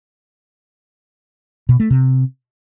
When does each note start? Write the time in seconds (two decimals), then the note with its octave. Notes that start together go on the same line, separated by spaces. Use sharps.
1.69 B2
1.80 A3
1.90 C3